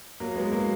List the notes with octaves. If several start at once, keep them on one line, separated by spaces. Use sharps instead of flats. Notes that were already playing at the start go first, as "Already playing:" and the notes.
F#3 A#3
G#3 B3
F#3 A#3